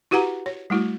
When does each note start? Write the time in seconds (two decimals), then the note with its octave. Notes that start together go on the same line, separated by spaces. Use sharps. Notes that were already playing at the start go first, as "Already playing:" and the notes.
0.11 E4 F#4 G4 B4 F#5 A#5
0.46 C#5
0.70 G3 A3 E4 F#4